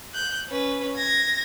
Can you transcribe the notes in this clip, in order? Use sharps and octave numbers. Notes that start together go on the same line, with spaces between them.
F#6 G6
C#4 B4
G#6 A#6